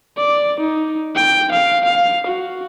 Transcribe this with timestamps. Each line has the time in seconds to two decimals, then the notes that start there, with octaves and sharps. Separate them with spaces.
0.17 D5
0.60 D#4
1.15 G5
1.52 F5
1.85 F5
2.26 F#4